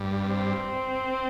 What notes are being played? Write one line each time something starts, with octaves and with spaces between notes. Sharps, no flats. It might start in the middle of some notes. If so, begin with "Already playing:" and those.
Already playing: G2
C4